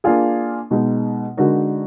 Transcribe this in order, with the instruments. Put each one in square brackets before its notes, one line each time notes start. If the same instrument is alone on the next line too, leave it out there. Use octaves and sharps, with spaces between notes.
[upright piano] A#3 D4 F4 G#4
B2 G#3 D#4
D3 G#3 D#4 F#4 A#4